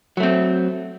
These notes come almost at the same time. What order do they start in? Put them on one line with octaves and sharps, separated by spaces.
F#3 A3 C4